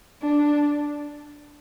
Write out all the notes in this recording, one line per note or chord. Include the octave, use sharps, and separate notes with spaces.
D4